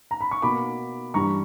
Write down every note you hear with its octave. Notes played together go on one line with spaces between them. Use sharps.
A#5
B5
C#6
B2 A#3 B5 D6
G2 E3 G3 A#5 C#6